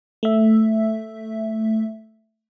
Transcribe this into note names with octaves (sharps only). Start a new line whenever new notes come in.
A3 E5